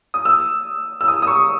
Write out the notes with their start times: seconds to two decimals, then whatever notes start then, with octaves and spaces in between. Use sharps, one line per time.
0.14 D#6
0.25 E6
1.01 E6
1.08 D#6
1.22 D#6
1.27 C#6